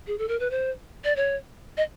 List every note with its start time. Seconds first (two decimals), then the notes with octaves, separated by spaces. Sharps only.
0.07 G#4
0.18 A4
0.28 A#4
0.40 B4
0.51 C5
1.04 D5
1.16 C#5
1.77 D#5